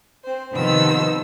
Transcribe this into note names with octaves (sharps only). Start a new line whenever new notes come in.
C4 C5
C3 D#3 F3 B3 E6